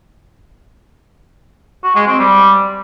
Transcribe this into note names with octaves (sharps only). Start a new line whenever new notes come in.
F#4
G#3
C4
G3